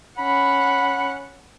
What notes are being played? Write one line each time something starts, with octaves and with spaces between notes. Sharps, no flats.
C#4 F#5 B5